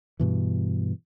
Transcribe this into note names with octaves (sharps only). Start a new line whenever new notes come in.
G2 B2 E3